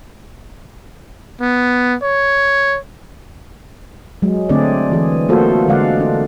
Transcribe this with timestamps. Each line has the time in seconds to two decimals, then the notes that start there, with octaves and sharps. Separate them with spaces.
1.41 B3
2.03 C#5
4.22 F#3 G#3
4.49 D3 A3 C4 D4 G#4 D5
4.92 E3 G#4
5.29 A3 A#3 F4 F#4 A4 C5
5.68 D3 G#3 D5 F5 F#5
6.00 D4